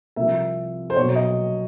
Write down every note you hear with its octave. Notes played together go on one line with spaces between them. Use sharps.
C2 C3 F3 E5
C5
B1 B2 F#3 C#5
D#5